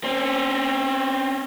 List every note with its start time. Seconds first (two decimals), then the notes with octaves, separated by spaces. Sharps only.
0.04 C4 C#4